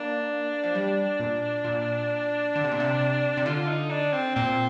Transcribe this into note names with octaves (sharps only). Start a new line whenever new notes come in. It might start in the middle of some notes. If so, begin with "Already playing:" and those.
Already playing: A#3 D4
F3
G3
A#2
A#2
D3
C3
A#2
C3
C3
D3 F4
D#4
D4
C4
A#2 C4